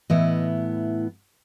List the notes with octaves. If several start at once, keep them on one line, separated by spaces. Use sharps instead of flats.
A2 E3 B3 E4 D#5